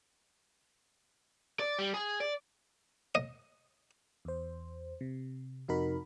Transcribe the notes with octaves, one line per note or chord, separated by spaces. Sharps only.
D5
G3
G#4
D5
D#5
E2 C5
C3
F2 C3 D#4 F#4 A#4 B5